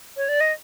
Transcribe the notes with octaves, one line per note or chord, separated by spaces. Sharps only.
C#5
D5
D#5